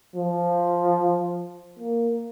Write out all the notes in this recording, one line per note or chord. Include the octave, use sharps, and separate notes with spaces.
F3
A#3